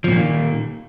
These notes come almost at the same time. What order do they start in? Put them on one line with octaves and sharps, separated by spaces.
F3 A#2 A#3 D#3